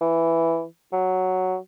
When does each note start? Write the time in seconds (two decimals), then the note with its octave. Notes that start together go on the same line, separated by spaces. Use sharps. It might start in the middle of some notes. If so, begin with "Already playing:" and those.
0.01 E3
0.93 F#3